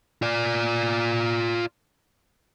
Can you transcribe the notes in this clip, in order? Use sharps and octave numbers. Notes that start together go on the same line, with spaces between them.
F4 D5